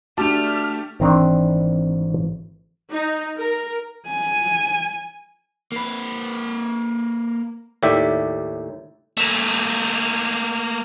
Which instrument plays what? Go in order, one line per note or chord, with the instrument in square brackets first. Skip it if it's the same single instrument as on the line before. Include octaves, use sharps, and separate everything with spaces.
[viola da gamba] A3 [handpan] D4 F#4 [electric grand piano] G4 A5 [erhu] F6
[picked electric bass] G#1 E3 [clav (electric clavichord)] D#3 C4 D4
[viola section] D#4
A#4
[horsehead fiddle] G#5
[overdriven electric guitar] A#3 B4
[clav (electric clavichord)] D#2 A2 G4 D5 E5
[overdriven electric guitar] A3 A#3